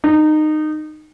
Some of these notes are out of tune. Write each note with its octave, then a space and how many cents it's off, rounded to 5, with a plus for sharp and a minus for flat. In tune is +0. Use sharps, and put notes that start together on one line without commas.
D#4 -20